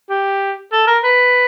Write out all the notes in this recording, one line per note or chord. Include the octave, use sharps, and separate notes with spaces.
G4
A4
A#4
B4